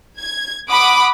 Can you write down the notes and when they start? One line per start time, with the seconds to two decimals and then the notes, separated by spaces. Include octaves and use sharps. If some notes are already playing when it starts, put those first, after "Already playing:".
0.18 G#6
0.68 F#5 B5 D6 D#6